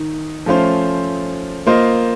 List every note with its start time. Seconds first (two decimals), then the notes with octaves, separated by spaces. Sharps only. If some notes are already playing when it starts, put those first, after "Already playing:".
Already playing: D#3 D#4
0.46 F3 A3 C#4 F4 C5
1.67 A#3 F4 C5 D#5